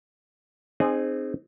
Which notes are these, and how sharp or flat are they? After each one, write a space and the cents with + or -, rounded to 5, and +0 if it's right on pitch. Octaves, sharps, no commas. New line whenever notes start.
C4 +0 D#4 -30 G#4 +0